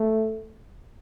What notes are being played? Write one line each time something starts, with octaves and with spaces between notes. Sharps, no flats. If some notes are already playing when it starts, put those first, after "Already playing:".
Already playing: A3